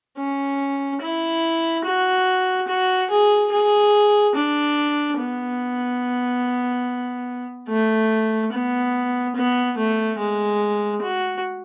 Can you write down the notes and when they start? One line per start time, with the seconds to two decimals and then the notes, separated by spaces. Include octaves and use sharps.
0.18 C#4
1.01 E4
1.85 F#4
2.68 F#4
3.10 G#4
3.52 G#4
4.35 D4
5.18 B3
7.69 A3
8.52 B3
9.36 B3
9.78 A3
10.19 G#3
11.02 F#4